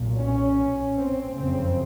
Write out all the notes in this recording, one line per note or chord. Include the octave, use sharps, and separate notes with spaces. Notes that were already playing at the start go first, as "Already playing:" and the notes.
Already playing: B1 A#2
C#4
C4
F#1 F2 C#3 C4